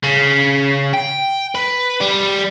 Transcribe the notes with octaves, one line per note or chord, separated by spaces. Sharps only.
C#3
G5
B4
G3